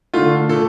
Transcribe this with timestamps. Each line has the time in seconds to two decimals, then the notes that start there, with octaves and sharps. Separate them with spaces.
0.14 D3 A3 F4
0.49 A#2 A3 A4